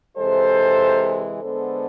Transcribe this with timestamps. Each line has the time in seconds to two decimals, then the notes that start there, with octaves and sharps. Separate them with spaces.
0.16 C3 E3 G#3 A4 C5
1.40 D3 G#3 B3 A4 C5